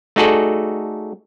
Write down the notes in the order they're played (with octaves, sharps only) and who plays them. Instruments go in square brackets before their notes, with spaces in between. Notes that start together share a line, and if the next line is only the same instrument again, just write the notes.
[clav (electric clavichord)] A3 D#4 F#4 G#4 A4 D5